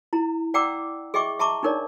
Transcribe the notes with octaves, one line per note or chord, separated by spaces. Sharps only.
E4 A#5
D5 F#5 G5 A#5 D6 E6
G#4 D#5 E5 G5 C#6 D6
E5 A5 A#5 C#6 D6
D4 D#4 A#4 C#5 D5